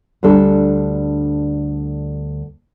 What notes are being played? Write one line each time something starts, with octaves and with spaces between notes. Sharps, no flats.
D2 G3 D4 A4